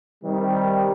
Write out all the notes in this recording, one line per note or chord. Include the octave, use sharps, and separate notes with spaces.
C3 D#3 G3